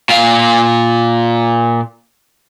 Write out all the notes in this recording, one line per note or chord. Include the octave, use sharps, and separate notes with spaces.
A#2 F5